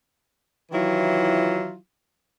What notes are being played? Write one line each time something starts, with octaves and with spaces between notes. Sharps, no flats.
D#3 E3 F#3 E4 F4